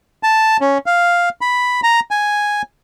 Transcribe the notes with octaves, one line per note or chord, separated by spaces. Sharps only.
A5
C#4
F5
B5
A#5
G#5